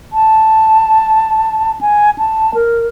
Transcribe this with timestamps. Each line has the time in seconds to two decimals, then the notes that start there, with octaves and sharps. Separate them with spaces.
0.13 A5
1.81 G#5
2.18 A5
2.54 A#4